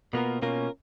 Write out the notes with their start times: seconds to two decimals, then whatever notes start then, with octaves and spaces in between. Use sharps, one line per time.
0.13 B2 A#3 B3 F4 A#4
0.42 B2 A#3 C#4 F4 A#4